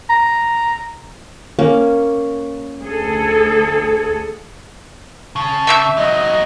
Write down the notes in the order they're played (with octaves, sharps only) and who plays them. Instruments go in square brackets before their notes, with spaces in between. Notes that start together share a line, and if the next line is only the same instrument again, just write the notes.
[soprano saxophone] A#5
[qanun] A#3 C#4
[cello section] D2 G#4 A4
[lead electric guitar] C#3 [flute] A5
[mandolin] E5 E6 G6
[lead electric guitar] F#3 D#4 [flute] D#5